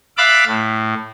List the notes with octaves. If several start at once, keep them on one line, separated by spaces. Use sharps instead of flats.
E5 F5 B5 D6 F#6 A6
A2